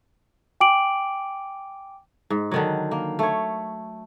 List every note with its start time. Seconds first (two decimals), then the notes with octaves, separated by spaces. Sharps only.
0.61 G5 G#5 D6 D7 F#7
2.30 G#2
2.51 D3 D#3 F#3
2.91 A#3
3.19 A3 C#5